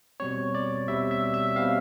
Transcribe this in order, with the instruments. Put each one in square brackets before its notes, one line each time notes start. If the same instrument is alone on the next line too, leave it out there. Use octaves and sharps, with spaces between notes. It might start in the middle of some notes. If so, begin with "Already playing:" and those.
[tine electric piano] B2 G3 C4 C#5
D5
B2 G3 C4 E5
E5
E5
B2 G3 C4 F5